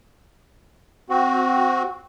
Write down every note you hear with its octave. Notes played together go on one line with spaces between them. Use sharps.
C4 F#4